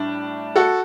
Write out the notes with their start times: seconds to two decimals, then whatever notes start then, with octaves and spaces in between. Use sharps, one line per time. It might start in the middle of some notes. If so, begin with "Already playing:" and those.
Already playing: A2 G3 D4
0.56 F#4 A4